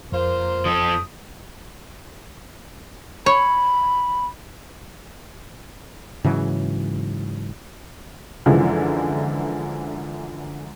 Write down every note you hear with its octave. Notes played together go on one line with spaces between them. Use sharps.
F2 A#3 F4 C5
F3 A4 D#6
C#5 B5
G#2 C#3 E3 F#3
F#2 D3 E3 F3 G#3